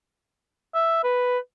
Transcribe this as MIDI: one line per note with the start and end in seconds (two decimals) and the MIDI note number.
0.74 1.03 76
1.04 1.38 71